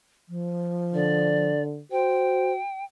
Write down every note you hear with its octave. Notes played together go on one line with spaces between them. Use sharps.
F3
D3 D5
F#4 C5 G5